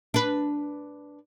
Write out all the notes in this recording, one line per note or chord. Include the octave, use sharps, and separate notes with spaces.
D4 B4